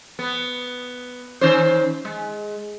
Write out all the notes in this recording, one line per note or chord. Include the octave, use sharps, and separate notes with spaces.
B3
D#3 C#4 C5
G#3